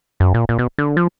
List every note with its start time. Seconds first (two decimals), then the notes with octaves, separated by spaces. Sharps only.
0.20 F#2
0.34 A#2
0.49 A#2
0.59 B2
0.78 D3
0.97 F3